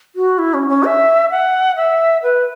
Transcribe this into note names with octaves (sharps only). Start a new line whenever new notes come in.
F#4
E4
C#4
C#4
E5
F#5
E5
B4